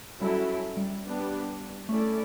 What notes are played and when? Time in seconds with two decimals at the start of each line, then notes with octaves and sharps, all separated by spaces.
0.21 F#3 G3 C#4 E4 A4
0.77 G3
1.05 B3 D4 G4
1.89 A3 C#4 E4 A4 D5